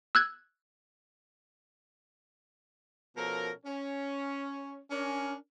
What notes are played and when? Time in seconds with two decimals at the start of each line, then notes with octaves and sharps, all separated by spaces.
0.15 E6 F#6 G#6
3.17 B2 F3 C#4 A4 A#4
3.66 C#4
4.91 C#4 D4 A#4